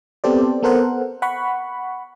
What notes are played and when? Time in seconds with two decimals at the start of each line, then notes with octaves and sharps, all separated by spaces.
0.24 B3 C4 G4 A4 C5 D5
0.63 B3 A4 A#4 C5 F#5
1.22 F#5 B5 C#6